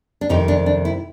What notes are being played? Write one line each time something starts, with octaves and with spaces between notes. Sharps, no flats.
D4
F2 C3 D#3 D#4
D4
D4
E4